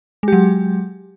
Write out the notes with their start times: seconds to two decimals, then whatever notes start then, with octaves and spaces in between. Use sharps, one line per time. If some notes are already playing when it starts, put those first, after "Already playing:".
0.23 G#3
0.28 G4
0.33 F#3